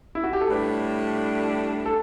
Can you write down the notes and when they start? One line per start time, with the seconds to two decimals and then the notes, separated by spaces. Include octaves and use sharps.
0.15 E4
0.24 F#4
0.33 G4
0.41 A4
0.50 A2 G3 D4 B4
1.86 A4